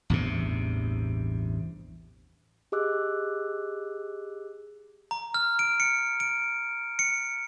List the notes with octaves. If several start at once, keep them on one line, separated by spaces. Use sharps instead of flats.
A1 E2 G2 C3
G4 G#4 D#5 D6 E6 F#6
A#5
F6
D7
C#7
D7
C#7